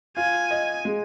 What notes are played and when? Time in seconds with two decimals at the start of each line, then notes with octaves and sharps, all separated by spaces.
0.17 F4 G#5
0.51 D#5
0.85 G#3